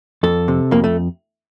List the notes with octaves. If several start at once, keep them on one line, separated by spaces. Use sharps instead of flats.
F2 A4
C3
F2 A#3
A3